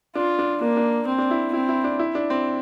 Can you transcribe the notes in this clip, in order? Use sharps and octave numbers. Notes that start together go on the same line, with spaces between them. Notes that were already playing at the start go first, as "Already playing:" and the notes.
D4 F4
D4
A#3 D4
D4
C4
D4
E4
C4 E4
E4
D4
E4
D4
C4